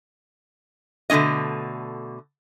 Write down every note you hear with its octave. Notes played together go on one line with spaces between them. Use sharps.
B2 D3 A3 C#4 D#5